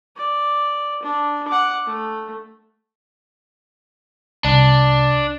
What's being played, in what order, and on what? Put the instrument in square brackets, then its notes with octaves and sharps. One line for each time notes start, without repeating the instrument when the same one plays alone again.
[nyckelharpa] D5
D4
F#5 D6
A3
[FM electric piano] C2 [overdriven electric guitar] D4